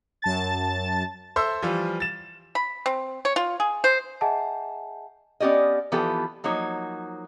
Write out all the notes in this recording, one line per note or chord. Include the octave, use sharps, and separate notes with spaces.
F#2 A5 A6
A4 C5 E5 C6 E6
E3 F3 G3 F4
A6 E7
B5
C4
C#5
F4
G#4
C5
G#4 D#5 E5 F#5 G#5 A5
B3 C#4 G4 D5 D#5
E3 F3 B3 F4 G4 A4
F3 F#3 A#3 D#4 C#5